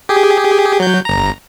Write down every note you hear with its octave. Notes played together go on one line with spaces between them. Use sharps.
G4 G#4
F#3 G6
G1 A#5